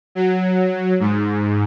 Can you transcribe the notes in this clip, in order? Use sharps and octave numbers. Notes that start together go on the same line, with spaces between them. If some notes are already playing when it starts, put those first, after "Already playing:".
F#3
G#2